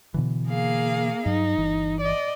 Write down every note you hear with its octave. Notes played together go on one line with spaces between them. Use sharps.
B2 D3 E3
A#3 G#4 F5
G2 F#3 D#4
G1 E3
D5 D#5